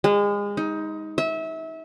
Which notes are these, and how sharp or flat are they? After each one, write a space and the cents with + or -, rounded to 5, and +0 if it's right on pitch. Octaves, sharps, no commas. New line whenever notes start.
G#3 -30
D#4 +20
E5 -25